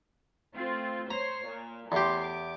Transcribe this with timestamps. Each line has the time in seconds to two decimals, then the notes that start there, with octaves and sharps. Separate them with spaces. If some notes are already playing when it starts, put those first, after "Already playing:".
0.55 A3 C4 F4
1.11 C5 C#5 A#5 C7
1.45 A#2
1.92 E2 A2 G4 C6 C7
2.25 D6